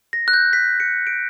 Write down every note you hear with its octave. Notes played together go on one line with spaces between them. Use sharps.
A#6
F#6
G6
B6
C#7
D7